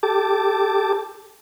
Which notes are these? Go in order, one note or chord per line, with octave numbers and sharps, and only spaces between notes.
G4 A4 A5 D6